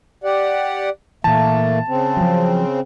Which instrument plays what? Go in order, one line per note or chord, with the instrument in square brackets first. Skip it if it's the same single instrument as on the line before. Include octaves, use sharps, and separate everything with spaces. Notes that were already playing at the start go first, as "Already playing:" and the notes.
[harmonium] G4 D5 F#5
[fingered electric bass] A#2 E3 [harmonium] A3 A#3 [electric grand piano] A5
[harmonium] C#3 C4
[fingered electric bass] F3 F#3